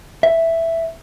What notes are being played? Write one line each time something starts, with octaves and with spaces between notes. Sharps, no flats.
E5